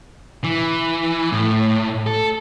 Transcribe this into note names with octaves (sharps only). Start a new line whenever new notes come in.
E3
A2
A4